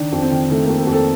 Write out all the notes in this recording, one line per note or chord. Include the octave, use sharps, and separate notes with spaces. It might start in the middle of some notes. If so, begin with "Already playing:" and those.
Already playing: D#3 D4
F2
C4
D#3
D#3 A3
A#3
F2
A4
F2
A4